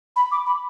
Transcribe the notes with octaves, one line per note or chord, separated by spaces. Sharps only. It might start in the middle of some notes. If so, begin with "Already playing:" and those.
B5
D6
B5